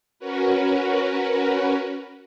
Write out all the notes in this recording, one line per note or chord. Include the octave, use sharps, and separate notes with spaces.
C#4 F#4 A#4 B4